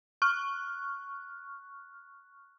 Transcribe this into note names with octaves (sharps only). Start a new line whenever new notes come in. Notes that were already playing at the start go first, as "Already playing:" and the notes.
C#6 F6 F#6